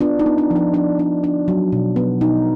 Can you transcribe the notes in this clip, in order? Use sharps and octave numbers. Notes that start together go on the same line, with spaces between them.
B3 D4 F4
D#4
B3
D4
F3
D4
F3 D4
D4
D4
F#3
B2
B3
B2 D#4